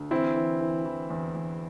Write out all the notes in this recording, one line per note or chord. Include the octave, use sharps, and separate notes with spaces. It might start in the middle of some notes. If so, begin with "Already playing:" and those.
Already playing: D2
E3 C4 E4
E3
E3
E3
E2
E2